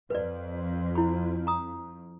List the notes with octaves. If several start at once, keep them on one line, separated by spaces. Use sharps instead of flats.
F2 B4 D5
E4 B5
A#5 D#6